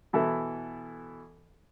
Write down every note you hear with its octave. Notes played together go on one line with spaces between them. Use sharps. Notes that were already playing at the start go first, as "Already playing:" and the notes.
B2 E3 E4 A4